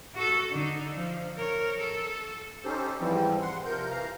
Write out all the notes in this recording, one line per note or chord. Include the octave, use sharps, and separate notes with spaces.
F#4 A4
D3 D#4
F3
A#4 C#5
A4
C#4 D#4 G4 A4 C5
G#2 E3 F3 G3 C4
F#5 C6
C3 F3 A#4 G6
E3 F5 A#5